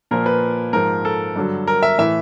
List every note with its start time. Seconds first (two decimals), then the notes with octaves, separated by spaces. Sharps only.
0.11 A#2 F3 A#4
0.26 B4
0.73 G#2 F3 A#4
1.05 A4
1.36 G2 D3 F#3
1.68 A#4
1.83 E5
1.98 A2 E3 E5